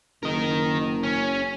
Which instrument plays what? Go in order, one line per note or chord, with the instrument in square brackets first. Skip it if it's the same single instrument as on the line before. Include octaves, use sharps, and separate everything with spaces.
[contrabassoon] F#1 [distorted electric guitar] A#4 D#5
[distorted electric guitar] C#4